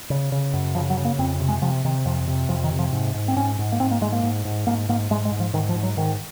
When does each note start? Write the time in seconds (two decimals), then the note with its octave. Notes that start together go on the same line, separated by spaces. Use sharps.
0.10 C#3
0.32 C#3
0.53 F#2
0.75 C#3 F3
0.90 F#3
0.97 C#3
1.05 A#3
1.18 F2 C4
1.40 C3
1.48 G#3
1.62 C3 F3
1.85 C3 D#3
2.05 F2 F3
2.28 C3
2.49 F2 F3
2.64 D#3
2.71 C3
2.79 F3
2.92 G#2
3.14 G#2
3.28 C4
3.36 G#2 C#4
3.59 G#2
3.72 A#3
3.80 G#2 C4
3.91 A#3
4.01 G#2 G#3
4.12 A#3
4.23 G#2
4.45 G#2
4.67 G#2 A#3
4.89 G#2 A#3
5.10 G#2 G#3
5.25 G#3
5.32 G#2
5.40 F3
5.53 G#2 D#3
5.69 F3
5.75 G#2
5.83 F#3
5.97 G#2 D#3